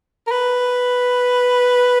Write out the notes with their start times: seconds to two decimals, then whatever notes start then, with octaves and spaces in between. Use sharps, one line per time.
0.27 A#4
0.31 B4